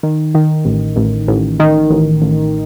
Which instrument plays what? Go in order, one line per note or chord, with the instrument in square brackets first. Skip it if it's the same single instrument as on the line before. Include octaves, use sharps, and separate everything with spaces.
[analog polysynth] D#3
D#3
A1
A1
A1
D#3
A1
A1